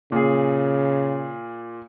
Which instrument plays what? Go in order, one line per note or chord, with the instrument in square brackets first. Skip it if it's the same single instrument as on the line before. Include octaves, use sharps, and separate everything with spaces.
[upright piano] A#2 G#4 [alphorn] C#3